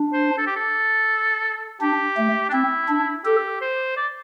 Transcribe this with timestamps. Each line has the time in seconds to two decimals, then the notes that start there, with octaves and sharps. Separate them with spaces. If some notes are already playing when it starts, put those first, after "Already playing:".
Already playing: D4
0.13 C5
0.38 A4
0.47 G4
0.56 A4
1.81 D4 G4
2.17 A3
2.49 D4
2.53 C4 E4
2.89 D4
3.25 G4 A4
3.61 C5
3.97 D5